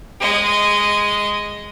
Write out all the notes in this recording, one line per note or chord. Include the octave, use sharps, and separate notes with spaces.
G#3 D#5